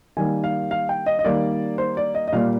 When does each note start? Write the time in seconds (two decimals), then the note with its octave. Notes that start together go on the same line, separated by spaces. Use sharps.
0.17 D#3 G3 A#3 G#5
0.44 F5
0.71 F5
0.89 G5
1.06 D#5
1.19 D#5
1.25 D#3 G3 A#3 D5
1.78 C5
1.97 D5
2.15 D#5
2.28 D#5
2.33 A#2 G3 A#3 F5